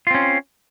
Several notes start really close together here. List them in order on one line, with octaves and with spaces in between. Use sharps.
F4 C4 C#4